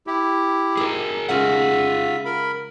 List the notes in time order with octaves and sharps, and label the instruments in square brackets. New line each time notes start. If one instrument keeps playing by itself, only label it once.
[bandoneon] E4 G4
[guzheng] D#4 [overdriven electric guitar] G#4 A#4
[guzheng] C#3 G#3 C#4 [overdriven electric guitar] F4 F#5 [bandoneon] E5
[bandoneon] A#4 B5